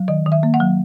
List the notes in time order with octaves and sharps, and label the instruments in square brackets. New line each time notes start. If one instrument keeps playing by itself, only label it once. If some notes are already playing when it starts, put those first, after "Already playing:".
Already playing: [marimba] F#3
D#3 D#5
D#3
E5
A#3
F#5
F#3